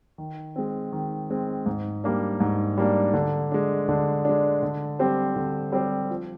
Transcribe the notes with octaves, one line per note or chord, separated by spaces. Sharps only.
D#3
G#3 C4
D#3
G#3 C4
G#2
G3 A#3 D4
G#2
G3 A#3 D4
D3
G#3 D4
D3
G#3 D4
D3
G3 C4 G4 C5
D3
G3 C4 G4 C5
F3